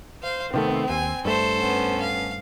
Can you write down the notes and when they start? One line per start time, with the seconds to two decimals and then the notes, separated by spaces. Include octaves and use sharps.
0.23 C5 F5
0.54 C3 D#3 A3 B3 C4
0.89 D#2 G#5
1.25 G2 A3 A4 C5
1.58 B3 C#4
2.01 F5